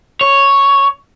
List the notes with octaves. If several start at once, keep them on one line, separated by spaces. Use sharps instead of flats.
C#5